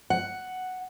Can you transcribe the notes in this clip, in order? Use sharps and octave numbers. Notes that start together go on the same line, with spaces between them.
F#5